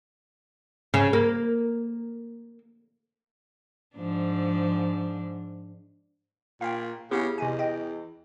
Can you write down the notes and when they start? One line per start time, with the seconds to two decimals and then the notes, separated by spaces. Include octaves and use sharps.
0.94 C#3
1.13 A#3
3.96 G#2 F3 D4
6.61 A#2 F5 G5
7.11 C#3 B3 E4 G4
7.38 E2 C3 D#5 G#5
7.59 D#5 G5